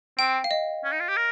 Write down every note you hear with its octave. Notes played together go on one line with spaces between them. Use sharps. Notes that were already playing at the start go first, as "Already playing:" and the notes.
C4 G5
F5
D#5
C#4
D#4
F4
G4
A#4